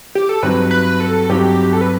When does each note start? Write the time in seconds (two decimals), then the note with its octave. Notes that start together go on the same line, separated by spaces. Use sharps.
0.15 G4
0.29 A4
0.42 G2 F#3 C4 D#4 B4
0.71 B4
1.00 A4
1.29 G2 F#3 C4 D#4 G4
1.73 A4
1.81 B4